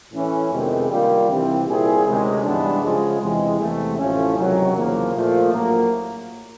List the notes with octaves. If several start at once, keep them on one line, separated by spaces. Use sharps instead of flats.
A2 E3 A3 C#4
F2 C3 D#3 G#3 B3
D#3 G3 A#3 D4 F4
C2 C3 E3 G3 C4
A#2 G3 C4 E4 G#4
D2 C3 D#3 G#3 C#4
G2 E3 G#3 B3 D4
C#3 F3 G#3
E2 C3 E3 G#3
E2 C3 E3 A3
A1 A2 F3 A3 C#4
C#2 C3 D#3 F#3
E2 C#3 F3 A#3
A#2 F3 A3
A#1 A2 F#3 A#3